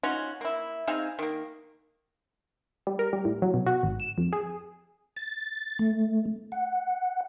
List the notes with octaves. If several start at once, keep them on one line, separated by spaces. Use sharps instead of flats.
C#4 D#4 F4 F#4
A#3 E4
C4 D#4 G#4 F5
D#3 A#3
G3
A#4
G3
A2
F#3
B2
F#4
G#1
E7
F2
G#4
A6
A3
F#5